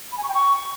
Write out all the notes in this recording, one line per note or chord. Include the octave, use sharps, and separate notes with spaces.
B5
G#5
C#6
G5
C#6